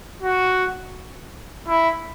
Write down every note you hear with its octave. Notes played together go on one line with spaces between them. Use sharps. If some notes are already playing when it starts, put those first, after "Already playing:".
F#4
E4